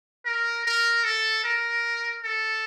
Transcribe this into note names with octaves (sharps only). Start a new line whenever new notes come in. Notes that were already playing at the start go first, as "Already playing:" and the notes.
A#4
A#4
A4
A#4
A4